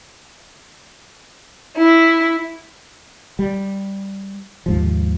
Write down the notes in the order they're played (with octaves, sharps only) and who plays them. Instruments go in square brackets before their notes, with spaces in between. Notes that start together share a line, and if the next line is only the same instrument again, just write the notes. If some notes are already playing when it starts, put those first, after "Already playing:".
[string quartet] E4
[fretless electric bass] G3
D#2 G#2 F3